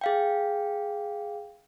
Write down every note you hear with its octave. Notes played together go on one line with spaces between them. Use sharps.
G#4 F5 G5